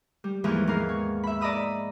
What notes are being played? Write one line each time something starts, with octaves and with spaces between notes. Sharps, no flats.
G3
D#2 G#2 E3 F3 G#3
G#2 B3 A#4 F5
C#5
E5 B5
D5 D#5 A#5 B5 D#6 E6